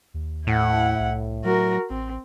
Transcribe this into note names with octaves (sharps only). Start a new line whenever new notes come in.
D#2
A2 E4 F#5
C2
F#3 F#4 A#4
A1 C4